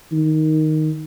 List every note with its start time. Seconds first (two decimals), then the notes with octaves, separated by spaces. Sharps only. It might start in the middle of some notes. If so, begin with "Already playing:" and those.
0.12 D#3